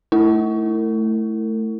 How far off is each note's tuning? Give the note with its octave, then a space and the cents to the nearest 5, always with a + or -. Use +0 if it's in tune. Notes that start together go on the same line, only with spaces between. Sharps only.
A3 +0 E4 +0 A#4 -40